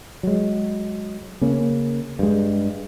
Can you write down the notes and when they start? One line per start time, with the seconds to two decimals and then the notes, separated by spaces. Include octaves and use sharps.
0.23 F#3 G#3
1.42 C#3 A#3 C#4
2.19 G2 G#3